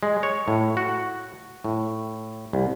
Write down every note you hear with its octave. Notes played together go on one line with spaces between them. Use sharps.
G#3
C#5
A2
F#4
A2
C2